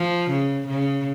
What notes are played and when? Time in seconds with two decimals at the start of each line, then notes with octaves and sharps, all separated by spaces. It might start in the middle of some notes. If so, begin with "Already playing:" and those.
Already playing: F3
0.30 C#3
0.67 C#3